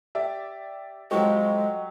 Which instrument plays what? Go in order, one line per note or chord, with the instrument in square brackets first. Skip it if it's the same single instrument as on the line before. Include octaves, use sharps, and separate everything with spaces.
[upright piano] G4 D5 E5
[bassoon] F2 [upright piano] F#3 F#4 G4 [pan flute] G#3 [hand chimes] D#5 C#6